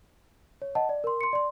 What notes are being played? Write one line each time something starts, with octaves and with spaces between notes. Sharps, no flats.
C#5
D#5 F#5 A5
D5
A#4 C6
C6 C#7
D5 C6